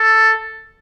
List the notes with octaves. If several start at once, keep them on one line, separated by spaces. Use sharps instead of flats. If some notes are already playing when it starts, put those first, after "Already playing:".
Already playing: A4